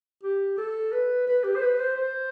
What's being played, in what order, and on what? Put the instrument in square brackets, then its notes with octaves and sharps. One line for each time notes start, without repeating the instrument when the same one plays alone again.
[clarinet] G4
A4
B4
B4
G4
C5
B4
C5
C5